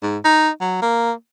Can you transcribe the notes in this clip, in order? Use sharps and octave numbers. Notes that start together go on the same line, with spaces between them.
G#2
D#4
F#3
A#3